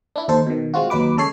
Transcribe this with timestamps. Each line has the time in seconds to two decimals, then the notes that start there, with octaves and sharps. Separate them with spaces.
0.16 D4 E4
0.28 D#2 D#4 A4 C5
0.46 B2 D#3
0.74 G#3 C4 F4 F#4
0.90 D#2 F#3 D#4 B4 D6
1.17 C#3 G#3 A4 C#5 C7